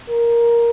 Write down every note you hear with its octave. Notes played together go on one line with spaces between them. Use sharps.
A#4